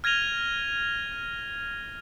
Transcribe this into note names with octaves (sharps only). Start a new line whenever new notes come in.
F6 G#6 A#6 D#7 F7 G7